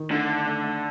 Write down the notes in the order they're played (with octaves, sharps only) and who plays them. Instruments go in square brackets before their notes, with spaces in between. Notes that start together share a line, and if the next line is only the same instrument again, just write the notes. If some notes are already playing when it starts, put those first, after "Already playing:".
Already playing: [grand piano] D#3
[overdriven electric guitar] D3 [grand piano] A3
[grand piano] A3
A3
A3